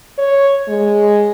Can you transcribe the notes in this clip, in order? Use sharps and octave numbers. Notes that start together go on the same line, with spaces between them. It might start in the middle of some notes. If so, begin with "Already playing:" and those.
C#5
G#3